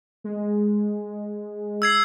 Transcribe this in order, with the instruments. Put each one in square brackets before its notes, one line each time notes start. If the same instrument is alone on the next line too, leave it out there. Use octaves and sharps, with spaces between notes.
[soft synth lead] G#3
[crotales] E6 G#6 C7